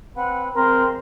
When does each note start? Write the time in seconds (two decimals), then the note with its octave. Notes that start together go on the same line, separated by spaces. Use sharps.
0.16 C4 B4 F#5
0.56 F3 G#3 C4 A#4 C6